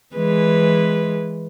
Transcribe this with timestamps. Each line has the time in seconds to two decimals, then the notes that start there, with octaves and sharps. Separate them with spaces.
0.16 E3 G#3 B4